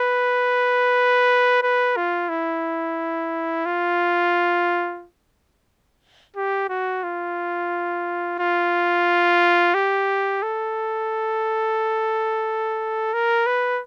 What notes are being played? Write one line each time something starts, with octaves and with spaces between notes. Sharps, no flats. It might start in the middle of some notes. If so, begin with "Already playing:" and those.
Already playing: B4
B4
F4
E4
F4
G4
F#4
F4
F4
G4
A4
A#4
B4